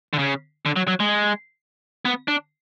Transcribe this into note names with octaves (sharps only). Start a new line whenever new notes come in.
D3
C#3
D3
F#3
F#3
G#3
B3
D4